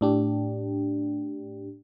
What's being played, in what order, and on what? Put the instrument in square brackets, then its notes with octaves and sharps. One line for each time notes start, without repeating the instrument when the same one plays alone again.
[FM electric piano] A2 D4 G4